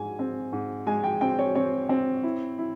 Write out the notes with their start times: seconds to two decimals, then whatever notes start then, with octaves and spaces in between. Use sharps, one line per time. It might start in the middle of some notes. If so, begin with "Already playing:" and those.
Already playing: G#2 G#3 G#5
0.19 C4
0.53 G#2
0.86 G#3 G#5
1.04 G5
1.21 C4 G5
1.39 C#5
1.55 C4 C#5
1.89 C4
2.23 E4
2.58 E4